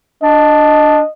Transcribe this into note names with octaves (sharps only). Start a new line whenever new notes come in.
D4 D#5